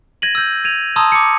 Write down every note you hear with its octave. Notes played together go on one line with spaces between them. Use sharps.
G#6 A#6 D#7 F#7
E6 G6
G#6 D#7 F7
A5 A#5 C6 D#6 E6
D6 C#7